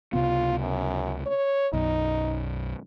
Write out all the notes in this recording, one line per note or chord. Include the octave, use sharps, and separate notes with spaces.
C#2 C3 B3 F4
F#2
C#5
B1 F#2 D#4